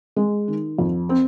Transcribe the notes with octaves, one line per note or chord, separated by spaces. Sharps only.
G#3
D#3
F2
C4